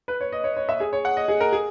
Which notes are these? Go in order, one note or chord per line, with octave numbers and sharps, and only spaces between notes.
B4
C#5
D#5
C#5
C#5
E5
G#4
C#5
F#5
D#5
G#4
A#4
G#4